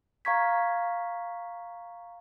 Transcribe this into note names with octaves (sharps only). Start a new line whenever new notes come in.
F5 A#5 C#6 G#6 B6